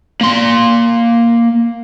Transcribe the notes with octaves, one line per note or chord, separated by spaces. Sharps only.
A#3 C6